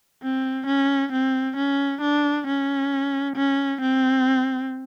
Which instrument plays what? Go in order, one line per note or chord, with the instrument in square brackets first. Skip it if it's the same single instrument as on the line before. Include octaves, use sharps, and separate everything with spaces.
[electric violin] C4
C#4
C4
C#4
D4
C#4
C#4
C4